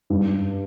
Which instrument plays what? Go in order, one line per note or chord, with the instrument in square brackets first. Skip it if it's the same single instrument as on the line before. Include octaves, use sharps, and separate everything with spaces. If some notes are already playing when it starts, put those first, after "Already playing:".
[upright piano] G2